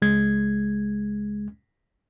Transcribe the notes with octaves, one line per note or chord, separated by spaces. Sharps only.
C#2 G#3 G#6